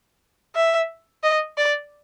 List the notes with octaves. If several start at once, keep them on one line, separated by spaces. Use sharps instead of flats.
E5
D#5
D5